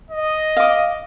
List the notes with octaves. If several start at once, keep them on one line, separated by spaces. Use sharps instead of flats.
D#5
F5 D6